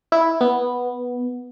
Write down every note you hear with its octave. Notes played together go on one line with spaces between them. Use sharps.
E4
B3